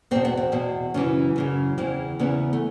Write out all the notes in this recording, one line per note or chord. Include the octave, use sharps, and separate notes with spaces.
E2 B2 C4
B3
C4
E2 B2
F#2 C#3 E3 C#4
F#2 C#3 E3
E2 C#3 E3 C4
E2 C#3 E3 B3
A3